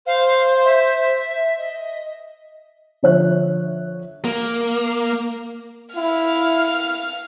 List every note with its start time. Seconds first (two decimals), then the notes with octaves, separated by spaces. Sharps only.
0.06 C5 F5
0.64 E5
1.58 D#5
3.03 D3 F3 C#5 E5 F#6
4.25 A#3
5.96 E4 F5 F6